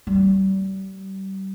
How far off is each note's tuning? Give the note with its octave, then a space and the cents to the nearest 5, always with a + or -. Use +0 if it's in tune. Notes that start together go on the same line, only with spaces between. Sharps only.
G3 -30